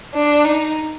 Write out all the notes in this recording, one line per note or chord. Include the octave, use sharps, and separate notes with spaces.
D4
D#4